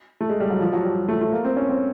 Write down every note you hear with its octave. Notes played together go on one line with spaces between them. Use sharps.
A3
G#3
G3
F#3
F3
F#3
G3
A3
A3
A#3
C4
C#4
C4